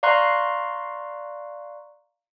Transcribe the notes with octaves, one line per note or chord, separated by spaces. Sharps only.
D5 F5 A#5 C6 C#6 F#6